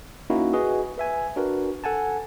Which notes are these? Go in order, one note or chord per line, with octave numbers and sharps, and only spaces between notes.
A#3 C#4 D#4 E4 F#4
F#4 G#4 B4 D#5
B4 E5 G#5
D4 F#4 A#4 B4
A4 F#5 G#5 A5